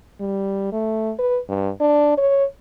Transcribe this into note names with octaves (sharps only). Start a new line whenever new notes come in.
G3
A3
B4
G2
D4
C#5